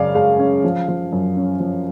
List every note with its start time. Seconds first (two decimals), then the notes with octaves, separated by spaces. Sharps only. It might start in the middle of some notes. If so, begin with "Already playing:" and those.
Already playing: F#2 C#3 G#3 C#4 D5 F5
0.15 G#3 F5
0.39 C#4
0.64 F3
0.88 F3
1.12 F#2
1.37 C#4
1.60 F3